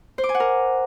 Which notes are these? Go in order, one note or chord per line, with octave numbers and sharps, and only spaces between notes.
C5
D6
G#5
F#5
A#4